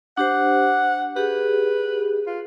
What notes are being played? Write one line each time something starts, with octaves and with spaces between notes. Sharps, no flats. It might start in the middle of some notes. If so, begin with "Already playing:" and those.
D4 G4 C5 F#5
G4 G#4 B4
F4